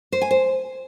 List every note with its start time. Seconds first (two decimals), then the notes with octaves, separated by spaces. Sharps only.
0.12 C5
0.22 G#5
0.31 C5